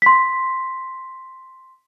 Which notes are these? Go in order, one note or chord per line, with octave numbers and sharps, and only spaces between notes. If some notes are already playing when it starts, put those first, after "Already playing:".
C6 B6